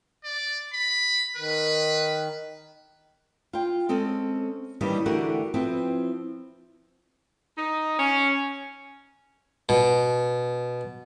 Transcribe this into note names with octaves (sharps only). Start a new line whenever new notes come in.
D5
B5
D#3 B4
F4 G5
G#3 C4 C#4 A4
D#3 E3 G3 A#3 C#4 D4
D3 E3 A3 F#4 G4 A#4
F3 C4 E4 B4
D#4
C#4
B2